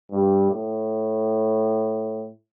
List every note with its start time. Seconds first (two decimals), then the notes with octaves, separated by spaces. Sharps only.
0.11 G2
0.51 A2